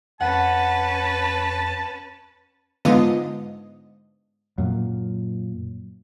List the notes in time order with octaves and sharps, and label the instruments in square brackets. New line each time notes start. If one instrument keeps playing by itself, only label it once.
[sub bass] F2 [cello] C#4 B4 [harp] F#5 [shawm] A5
[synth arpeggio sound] G#2 D3 B3 F4 D#5 D#6
[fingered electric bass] F#2 A#2